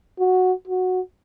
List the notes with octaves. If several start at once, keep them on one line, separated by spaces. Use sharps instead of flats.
F#4
F#4